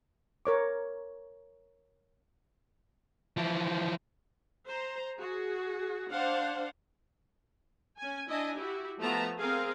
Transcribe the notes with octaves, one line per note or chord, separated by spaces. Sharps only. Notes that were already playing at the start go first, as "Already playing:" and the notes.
A#4 C#5 D6
E3 F3
C5 A#5
F#4 G#4
D4 C5 F5 F#5
C#4 G#5
D4 E4 D#5 G#5
E4 F#4 G4
F3 A3 B3 E5 A5 A#5
C4 G#4 A#4 F5